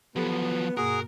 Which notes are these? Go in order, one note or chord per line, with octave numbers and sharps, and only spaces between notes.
F3 F#3 B3 G4 A4 B4
G2 B2 A#3 F#4 G#4 A#4